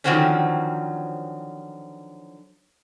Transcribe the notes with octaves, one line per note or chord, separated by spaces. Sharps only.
D3 D#3 F3 F#3 C4 C#4